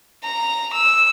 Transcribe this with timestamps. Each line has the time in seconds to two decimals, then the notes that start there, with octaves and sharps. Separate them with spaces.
0.24 A#5
0.74 E6